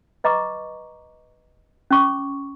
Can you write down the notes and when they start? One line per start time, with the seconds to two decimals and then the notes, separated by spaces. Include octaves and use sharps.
0.24 B4 D#5 A#5 C#6 D6
1.91 C#4 C#6 D6